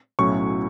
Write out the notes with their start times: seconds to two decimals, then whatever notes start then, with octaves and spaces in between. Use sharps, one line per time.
0.19 B1 A2 F#3 C#4 E4 C#6